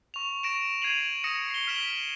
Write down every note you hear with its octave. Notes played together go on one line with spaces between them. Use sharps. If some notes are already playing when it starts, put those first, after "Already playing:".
C#6 F7
C#6 A#6 D7 E7
G#6 C7 D#7 F7 F#7
D#6 A#6 C#7 D7 E7
C7 G7
F6 B6 D7 E7 F#7 G7